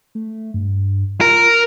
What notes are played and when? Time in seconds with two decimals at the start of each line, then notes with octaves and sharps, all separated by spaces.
0.15 A3
0.54 G2
1.21 F4 A#4